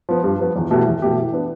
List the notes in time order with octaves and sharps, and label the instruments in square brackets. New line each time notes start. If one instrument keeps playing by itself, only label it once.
[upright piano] F3 B3
G2
F3 B3
E2
B2 A3 E4 G4
E2
B2 A3 E4 G4
E3
B3 D4